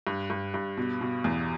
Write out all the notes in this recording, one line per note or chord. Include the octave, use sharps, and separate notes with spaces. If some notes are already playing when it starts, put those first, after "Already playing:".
G2
G2
G2
B2
B2
E2